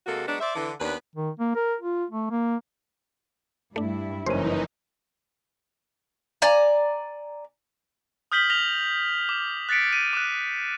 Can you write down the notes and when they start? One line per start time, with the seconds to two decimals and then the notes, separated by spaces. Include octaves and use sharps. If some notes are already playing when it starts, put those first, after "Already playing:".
0.07 C3 G#3 A#3 F#4 A4
0.27 F#3 G#3 B3 D4
0.41 C5 D5 E5
0.56 D3 E3
0.80 D#2 B3 D4 B4
1.15 D#3
1.39 A#3
1.55 A#4
1.81 F4
2.10 A3
2.31 A#3
3.76 G2 A3 D4 E4
4.26 F#1 E3 C#4 D#4 C5 D#7
6.42 D5 G#5 A#5
8.32 D#6 F6 G6 B6 F#7 G7
8.50 F6 A#6 F7 G7
9.29 D6
9.69 F#6 A6 B6 C#7 D7
9.93 D#7
10.13 D6 F#6